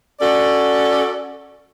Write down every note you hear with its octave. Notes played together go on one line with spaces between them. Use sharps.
C#4 F#4 A4 D5